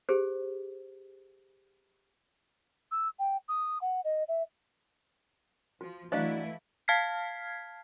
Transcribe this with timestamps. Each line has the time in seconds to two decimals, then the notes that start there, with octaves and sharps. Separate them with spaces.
0.09 G4 G#4 C5
2.91 E6
3.19 G5
3.48 D#6
3.81 F#5
4.04 D#5
4.28 E5
5.81 F3 F#4
6.12 E3 F#3 A3 D4 E4 F#4 D#5 F5
6.88 F5 A5 F6 G#6 B6 C7